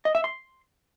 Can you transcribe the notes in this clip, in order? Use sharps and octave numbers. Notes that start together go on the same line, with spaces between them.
D#5
E5
C6